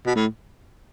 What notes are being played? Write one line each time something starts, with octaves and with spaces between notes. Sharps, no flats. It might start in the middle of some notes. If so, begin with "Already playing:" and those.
B2
A2